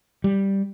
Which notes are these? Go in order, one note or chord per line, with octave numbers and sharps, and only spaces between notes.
G3